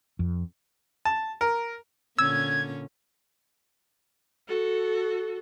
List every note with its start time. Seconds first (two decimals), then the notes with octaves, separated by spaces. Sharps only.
0.19 F2
1.05 A5
1.41 A#4
2.18 A#2 D3 C#4 E6 G#6
4.48 F#4 A4